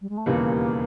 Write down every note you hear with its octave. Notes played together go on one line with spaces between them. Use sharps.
G3
G#3
A3
E1 D#2 C#3 E3 G3 A#3